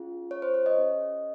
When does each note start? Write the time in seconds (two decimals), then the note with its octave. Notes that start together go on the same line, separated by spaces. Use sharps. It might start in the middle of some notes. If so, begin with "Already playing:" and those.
Already playing: C#4 F4 G#4
0.31 C#5
0.42 C5
0.54 C#5
0.66 D#5
0.78 C#4 G#4